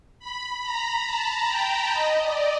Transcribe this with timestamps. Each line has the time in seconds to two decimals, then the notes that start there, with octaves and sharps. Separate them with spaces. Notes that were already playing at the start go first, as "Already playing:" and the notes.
0.19 B5
0.62 A#5
1.06 A5
1.49 G5
1.92 D#5
2.21 D5